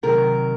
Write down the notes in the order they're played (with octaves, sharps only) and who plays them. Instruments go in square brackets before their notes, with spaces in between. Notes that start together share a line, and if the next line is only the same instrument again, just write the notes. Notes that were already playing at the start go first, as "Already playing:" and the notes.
[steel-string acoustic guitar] C3 D#3 F#3 A#4